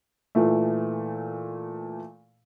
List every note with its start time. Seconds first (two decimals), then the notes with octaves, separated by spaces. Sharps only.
0.35 A#2 E3 A3